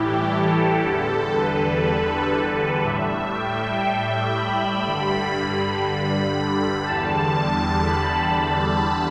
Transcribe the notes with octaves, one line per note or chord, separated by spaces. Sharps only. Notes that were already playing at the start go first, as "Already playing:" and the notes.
Already playing: A2 E3 G3 E4 G4
A4
E2 D3 G3
B4
A2 G3 E5
G5
B5
G2 D3 G3
B5
E2 D3 G3 A5
B5
A5